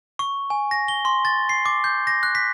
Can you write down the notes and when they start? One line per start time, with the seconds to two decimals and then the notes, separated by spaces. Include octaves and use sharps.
0.19 C#6
0.50 G#5
0.71 A#6
0.88 G7
1.05 C6
1.25 A6
1.49 C7
1.65 D6
1.84 G6
2.07 A#6
2.23 F#6
2.35 B6